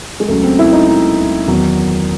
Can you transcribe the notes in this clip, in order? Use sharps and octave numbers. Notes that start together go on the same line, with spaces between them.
G#3
C#2 C#3 F#3 A3
C4
E4
D#4
D#4
E2 D#3 F#3